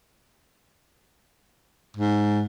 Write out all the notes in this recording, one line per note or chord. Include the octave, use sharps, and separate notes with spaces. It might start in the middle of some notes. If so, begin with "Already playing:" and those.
G#2